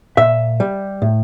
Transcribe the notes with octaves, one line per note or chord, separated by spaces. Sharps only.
A#2 E5
G3
A2